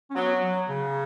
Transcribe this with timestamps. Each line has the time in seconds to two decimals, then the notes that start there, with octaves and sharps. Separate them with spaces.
0.10 C#4
0.16 F#3 B3
0.42 F#3
0.69 C#3